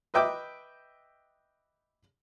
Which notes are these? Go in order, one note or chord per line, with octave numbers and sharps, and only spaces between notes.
B4 D#5 E5 G5 D6